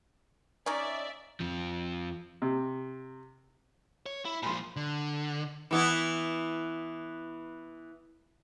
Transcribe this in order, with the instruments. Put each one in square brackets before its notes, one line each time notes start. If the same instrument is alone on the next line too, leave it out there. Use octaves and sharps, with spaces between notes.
[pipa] C#4 D#4 [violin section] D5 E5
[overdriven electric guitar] F2 F3
[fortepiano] C3
[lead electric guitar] C#5
E4
[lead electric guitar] A#2 F3 [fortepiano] B5 C6
[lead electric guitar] D3
[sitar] E3 B3 E4